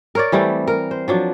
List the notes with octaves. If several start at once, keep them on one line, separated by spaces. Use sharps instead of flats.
A#4 C#5 D5
E3 G3 A3 C4
A#4
C5
F3 F#3 D4